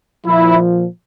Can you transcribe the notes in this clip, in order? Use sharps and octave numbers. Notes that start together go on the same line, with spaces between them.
A#2 F3 E4